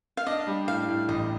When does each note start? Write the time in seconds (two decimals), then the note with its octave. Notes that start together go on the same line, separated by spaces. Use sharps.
0.17 F5
0.27 D4 D#5
0.47 G3
0.67 A2 F5
0.88 A2
1.08 A1 D#5